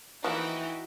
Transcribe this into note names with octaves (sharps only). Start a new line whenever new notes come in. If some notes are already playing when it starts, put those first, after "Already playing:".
E3 F3 A3 A#3 D#4 E4 F#4 G5